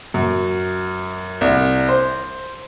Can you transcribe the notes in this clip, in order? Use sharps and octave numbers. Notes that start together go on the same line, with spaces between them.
F#2
C2
C5